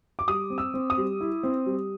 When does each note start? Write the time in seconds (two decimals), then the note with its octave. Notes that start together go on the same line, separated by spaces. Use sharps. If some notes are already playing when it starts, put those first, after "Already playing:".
0.19 D6
0.28 G3 D#6
0.50 C4
0.58 E6
0.74 C4
0.90 D#6
0.98 G3
1.21 E4
1.43 C4
1.66 G3